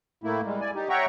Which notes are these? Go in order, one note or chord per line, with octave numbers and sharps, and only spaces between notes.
A2 A3 A#3 E4
G3 G#3
D5 G#5
D#4 G4
C#5 E5 F#5 G5 A#5 C#6